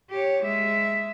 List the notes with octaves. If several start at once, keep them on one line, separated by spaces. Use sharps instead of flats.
G4 C#5
G#3 E5